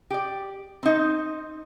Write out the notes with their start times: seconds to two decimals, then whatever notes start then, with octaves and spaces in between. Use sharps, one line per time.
0.10 G4 D5
0.83 C4 D#4